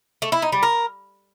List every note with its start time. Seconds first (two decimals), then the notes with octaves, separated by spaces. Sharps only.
0.22 A3
0.32 E4
0.42 D#4
0.52 G3
0.63 A#4